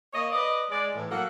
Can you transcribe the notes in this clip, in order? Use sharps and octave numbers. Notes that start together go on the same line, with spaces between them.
A#3 C#5 D#5
B4 D5 D#5
G#3 D5
A2 E3
F#3 A#3 A4 F#5